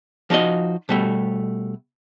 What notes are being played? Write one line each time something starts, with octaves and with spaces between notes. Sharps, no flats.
F3 D#4 F#4 D#5
B2 G3 A3